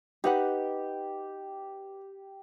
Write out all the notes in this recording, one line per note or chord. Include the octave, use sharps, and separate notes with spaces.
D#4 G4 B4 F#5